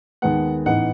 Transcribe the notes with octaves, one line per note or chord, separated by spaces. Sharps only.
D#2 D#3 G#3 B3 F#5
A1 G#2 E3 B3 D#4 F#5